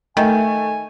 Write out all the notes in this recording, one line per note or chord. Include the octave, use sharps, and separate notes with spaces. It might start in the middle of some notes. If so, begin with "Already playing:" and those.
D#3 A3 G#5